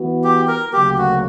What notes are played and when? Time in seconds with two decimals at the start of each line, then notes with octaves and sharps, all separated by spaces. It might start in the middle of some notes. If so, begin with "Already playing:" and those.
Already playing: E3 B3 F#4
0.24 G4
0.48 A#4
0.73 D2 C#3 F#3 A#3 G4
0.98 F#4